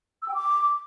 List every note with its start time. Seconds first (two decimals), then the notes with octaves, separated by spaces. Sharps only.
0.22 E6
0.28 G5
0.34 D6